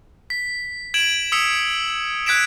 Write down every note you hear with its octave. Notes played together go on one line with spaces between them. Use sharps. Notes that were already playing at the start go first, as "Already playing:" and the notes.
B6
G#6 D7 E7 F#7
D#6 E6 B6 C#7 F7
F#6 G#6 B6 D7 E7